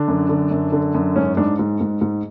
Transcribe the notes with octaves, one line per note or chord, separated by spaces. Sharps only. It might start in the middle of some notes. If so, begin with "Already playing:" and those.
Already playing: D3 D4
F#2
D3
F#2
D3
F#2
G#2 C#4
G#2 D4
G#2
G#2
G#2